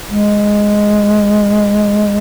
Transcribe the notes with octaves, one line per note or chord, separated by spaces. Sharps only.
G#3